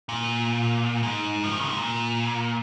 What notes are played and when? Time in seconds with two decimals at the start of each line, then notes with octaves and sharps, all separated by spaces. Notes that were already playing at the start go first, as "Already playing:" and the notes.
0.09 A#2
1.03 G#2
1.44 F3
1.52 D#3
1.61 C#3
1.69 C3
1.78 A#2